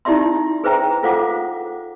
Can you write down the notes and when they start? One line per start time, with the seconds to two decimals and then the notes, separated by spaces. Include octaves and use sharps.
0.05 D#4 E4 G4 D5 E5 C6
0.64 G#4 B4 C5 E5 G5 A#5
1.03 F4 A4 C5 F5 F#5 D6